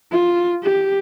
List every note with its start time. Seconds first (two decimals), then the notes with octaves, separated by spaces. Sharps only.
0.12 F4
0.63 G4